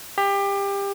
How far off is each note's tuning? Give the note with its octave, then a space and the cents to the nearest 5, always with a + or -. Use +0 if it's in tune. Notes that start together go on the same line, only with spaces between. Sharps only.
G4 +25